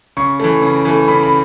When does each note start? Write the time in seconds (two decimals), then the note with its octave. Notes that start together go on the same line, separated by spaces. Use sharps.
0.17 C#3 C#6
0.40 E3 A3
0.62 C#3
0.85 E3 A3
1.08 C#3 B5
1.23 B5